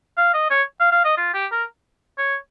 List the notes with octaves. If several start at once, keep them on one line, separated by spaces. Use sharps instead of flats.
F5
D#5
C#5
F5
F5
D#5
F4
G4
A#4
C#5